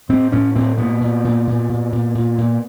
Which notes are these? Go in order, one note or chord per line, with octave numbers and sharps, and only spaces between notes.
A2 C4
A2 C#4
A2 C4
A#2 B3
A#2
A#2
A#2
A#2
A#2
A#2
A#2